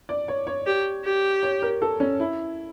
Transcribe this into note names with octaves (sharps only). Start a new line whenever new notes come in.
D5
C#5
C#5
G4
G4
C#5
A#4
A4
C#4
E4